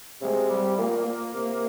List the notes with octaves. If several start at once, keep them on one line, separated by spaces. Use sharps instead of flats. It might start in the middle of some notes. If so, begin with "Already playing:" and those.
C3 G#3
G3
A#2 A#3
A#2
C3